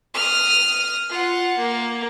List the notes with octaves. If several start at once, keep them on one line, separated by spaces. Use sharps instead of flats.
D#6 F6
F4 F#5
A#3